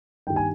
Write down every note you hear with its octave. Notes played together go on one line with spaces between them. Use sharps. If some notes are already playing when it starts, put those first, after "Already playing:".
G2 D#3 G3 G5
G#5